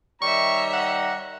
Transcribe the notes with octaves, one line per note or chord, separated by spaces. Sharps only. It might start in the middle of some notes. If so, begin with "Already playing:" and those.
D#3 G3 C#5 E5 A#5 C#6
F#5